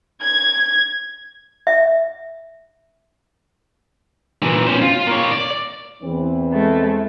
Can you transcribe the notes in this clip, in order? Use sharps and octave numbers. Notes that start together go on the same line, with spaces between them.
G#6
E5
A#2 E3
C#4 C5
F4
A#3 C#5
D5
E2 E3 C4
G#3 A3